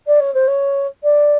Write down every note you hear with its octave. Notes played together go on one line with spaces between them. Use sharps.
D5
C#5
C5
C#5
D5